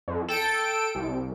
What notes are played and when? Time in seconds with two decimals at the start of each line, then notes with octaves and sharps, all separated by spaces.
0.08 F2
0.28 A4 G5 D7
0.95 C2